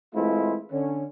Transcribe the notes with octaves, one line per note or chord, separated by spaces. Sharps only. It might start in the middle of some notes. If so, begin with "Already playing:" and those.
E3 G#3 A3 C4 E4 F4
D3 C#4